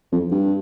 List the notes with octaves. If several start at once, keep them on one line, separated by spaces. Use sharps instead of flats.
F2
G2